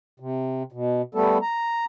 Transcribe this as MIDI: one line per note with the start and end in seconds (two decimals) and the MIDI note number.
0.20 0.63 48
0.72 1.02 47
1.15 1.38 55
1.15 1.38 57
1.15 1.38 59
1.15 1.38 69
1.42 1.85 82